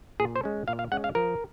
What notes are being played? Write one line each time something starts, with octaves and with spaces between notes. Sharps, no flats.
A#2 G#4
C5
G#3 C#4
A#2 F5
F5
G#3 C#4 F#5
F5
F3 A#4